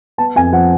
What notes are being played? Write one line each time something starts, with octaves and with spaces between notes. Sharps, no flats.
B3 A5
F2 G#5
F3 F#5